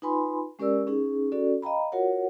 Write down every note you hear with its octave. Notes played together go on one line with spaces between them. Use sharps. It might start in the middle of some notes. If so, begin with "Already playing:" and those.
D#4 F4 B4 G#5 B5 C6
G#3 C#4 G4 A#4 D5 E6
C#4 D#4 G#4
C#4 F#4 A4 D5
D#5 F5 G5 A#5 B5
F4 F#4 A#4 C#5 F#5